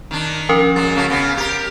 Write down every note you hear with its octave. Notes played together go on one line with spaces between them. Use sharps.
D#3 D4
F3 C#4 A#4
F#3 G#3 A6
C#3 F#3 A3
C#3 B3
G4 A#4